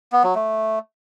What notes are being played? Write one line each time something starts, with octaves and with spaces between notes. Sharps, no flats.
B3
F#3
A3